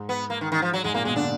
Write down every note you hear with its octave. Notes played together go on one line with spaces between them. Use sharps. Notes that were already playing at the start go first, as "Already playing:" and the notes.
Already playing: G#2
B3
A#3
D#3
D#3
F3
F#3
G#2 G#3
A#2 A#3
B2 G#3
D3 D4